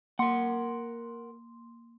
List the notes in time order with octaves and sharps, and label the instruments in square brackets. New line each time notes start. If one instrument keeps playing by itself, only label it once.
[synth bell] A#3 C6 [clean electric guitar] A#4 F#5